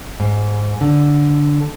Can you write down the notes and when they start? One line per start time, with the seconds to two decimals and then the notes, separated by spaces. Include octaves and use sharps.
0.20 G#2
0.81 D3